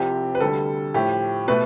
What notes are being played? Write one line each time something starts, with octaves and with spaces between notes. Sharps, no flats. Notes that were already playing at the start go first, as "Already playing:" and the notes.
Already playing: C2 C3 F3 C4 G4
B4
D2 D3 G3 A4
A2 F3 A3 G4
B2 A3 B4